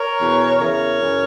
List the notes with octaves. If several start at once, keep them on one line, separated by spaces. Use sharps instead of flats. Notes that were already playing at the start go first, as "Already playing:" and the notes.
Already playing: A#4 C#5
E2 B2
E2 C#3 E3 A#4 C#5
F#2 C#3 E3